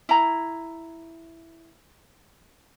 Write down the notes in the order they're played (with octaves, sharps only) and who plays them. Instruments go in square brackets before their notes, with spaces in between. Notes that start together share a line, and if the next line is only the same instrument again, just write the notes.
[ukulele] E4 A#5